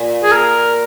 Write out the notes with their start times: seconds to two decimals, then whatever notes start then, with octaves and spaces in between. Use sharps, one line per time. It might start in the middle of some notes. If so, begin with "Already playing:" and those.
Already playing: A#2
0.24 G#4
0.33 A#4